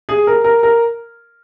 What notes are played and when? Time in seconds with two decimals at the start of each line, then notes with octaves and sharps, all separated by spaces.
0.09 G#4
0.27 A#4
0.44 A#4
0.63 A#4